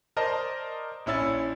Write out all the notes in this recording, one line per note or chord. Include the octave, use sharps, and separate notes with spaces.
A#4 C5 D5 D#5 A5
A#1 C#4 E4 E6 A6